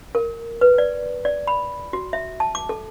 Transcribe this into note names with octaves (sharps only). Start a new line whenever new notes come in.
A#4
B4
D5
D5
B5
F#4
E5
A5
D6
A4